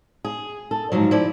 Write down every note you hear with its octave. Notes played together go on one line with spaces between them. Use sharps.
G#4
A4
G#2 D3 F3 F#3
F3 E4 D5